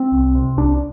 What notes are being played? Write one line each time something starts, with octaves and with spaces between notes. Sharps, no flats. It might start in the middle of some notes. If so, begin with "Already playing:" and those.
Already playing: C4
C2
C3
C2 D4